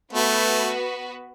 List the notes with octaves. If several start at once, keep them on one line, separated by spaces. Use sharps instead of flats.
A3 B3 F#4 B4